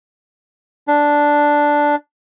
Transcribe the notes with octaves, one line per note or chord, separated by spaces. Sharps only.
D4